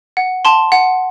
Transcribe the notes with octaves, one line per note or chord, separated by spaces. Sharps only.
F#5
A5 C6
F#5